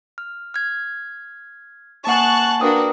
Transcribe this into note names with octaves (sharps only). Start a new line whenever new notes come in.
F6
F6 G#6
A#3 F#5 G#5 A5 C#6 F#6
A#3 D4 F#4 B4 G5 D#6